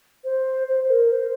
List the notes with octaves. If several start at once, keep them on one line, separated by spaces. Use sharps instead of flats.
C5
C5
A#4
C5